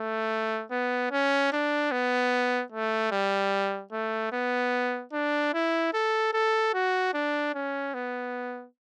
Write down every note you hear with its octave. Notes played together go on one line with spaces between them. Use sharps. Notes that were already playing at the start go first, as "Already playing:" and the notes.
Already playing: A3
B3
C#4
D4
B3
A3
G3
A3
B3
D4
E4
A4
A4
F#4
D4
C#4
B3